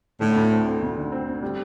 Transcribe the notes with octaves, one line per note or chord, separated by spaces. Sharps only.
A2 D3
D2
C4
C4
D2
D3
C4
C4
G3